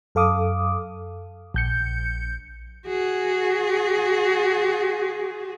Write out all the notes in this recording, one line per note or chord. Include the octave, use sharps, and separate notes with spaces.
F#2 A4 F5 D6 D#6
A#1 G6 C#7
F#4 G#4